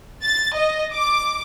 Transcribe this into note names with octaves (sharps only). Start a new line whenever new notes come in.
A6
D#5
D6